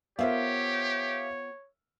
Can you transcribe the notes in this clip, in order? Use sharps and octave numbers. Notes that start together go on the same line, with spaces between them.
B3 F4 G4 A#4 C5 C#5 E5 F5